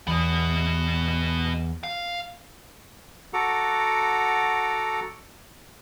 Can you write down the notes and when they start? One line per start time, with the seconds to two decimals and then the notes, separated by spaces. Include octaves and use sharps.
0.07 E2 B3 D#5
1.83 F5
3.33 F#4 A4 F#5 A#5 D6